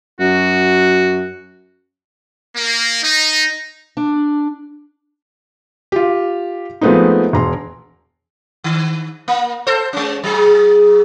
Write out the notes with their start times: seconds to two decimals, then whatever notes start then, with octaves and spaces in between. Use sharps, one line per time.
0.20 F#2 F#4
2.56 A#3
3.04 D#4
3.97 D4
5.92 F4 G4
6.81 F3 G#3 A3 B3 C4 D#4
7.33 E1 A#5 C6
8.64 D#3
9.28 A#3
9.67 A4 C5
9.93 G#3 C#4
10.23 F#3 G#4